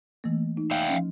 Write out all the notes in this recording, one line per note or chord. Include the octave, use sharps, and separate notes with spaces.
E3 A3 A#3
D#4
E5 F5 G5
F3 C#4